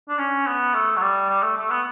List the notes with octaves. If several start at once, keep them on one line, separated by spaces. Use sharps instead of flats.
D4
C#4
B3
A3
F#3
G3
G3
A3
A3
B3